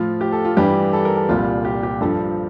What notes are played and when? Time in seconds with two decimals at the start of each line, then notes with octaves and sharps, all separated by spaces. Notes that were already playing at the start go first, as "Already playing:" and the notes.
Already playing: A2 F3 F4
0.21 G4
0.32 A4
0.45 F4
0.57 G2 E3 G3 G4
0.93 A4
1.05 A#4
1.17 A4
1.29 C2 A#2 G3 F4
1.65 G4
1.83 G4
2.01 G2 F3 A4